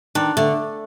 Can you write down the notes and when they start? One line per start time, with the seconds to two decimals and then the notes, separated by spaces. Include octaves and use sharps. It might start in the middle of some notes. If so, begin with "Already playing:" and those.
0.15 D#3 D4
0.37 D3 A3